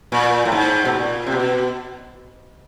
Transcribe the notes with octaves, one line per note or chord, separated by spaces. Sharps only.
A#2
A2
G#2
B2
A#2
C3
B2